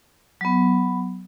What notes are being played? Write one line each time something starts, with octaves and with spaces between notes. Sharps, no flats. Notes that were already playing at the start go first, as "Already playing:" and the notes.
F#3 B3